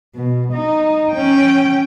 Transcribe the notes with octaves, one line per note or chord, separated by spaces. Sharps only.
B2
D#4
C#4 G5